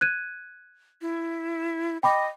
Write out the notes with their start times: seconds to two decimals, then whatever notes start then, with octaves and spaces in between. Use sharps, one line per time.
0.01 F#6 G#6 D#7
1.02 E4
2.03 D#5 G5 B5 D6